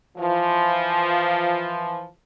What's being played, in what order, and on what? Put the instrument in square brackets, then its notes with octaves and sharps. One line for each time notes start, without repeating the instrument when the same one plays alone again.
[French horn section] E3 F3